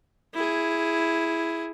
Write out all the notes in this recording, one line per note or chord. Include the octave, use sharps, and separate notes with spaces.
E4 G#4